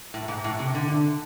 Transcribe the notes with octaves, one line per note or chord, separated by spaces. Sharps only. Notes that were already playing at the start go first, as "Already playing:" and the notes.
A2
G#2
A2
C3
D3